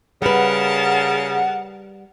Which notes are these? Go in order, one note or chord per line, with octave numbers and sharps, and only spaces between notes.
C#3 G3 A#4 B4 F#5 A5